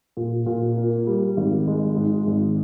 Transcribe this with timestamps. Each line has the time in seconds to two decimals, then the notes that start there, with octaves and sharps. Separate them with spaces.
0.17 A#2
0.46 A#2
0.77 A#3
1.07 G3
1.37 G#1
1.67 G#3
1.97 G#2
2.27 G#1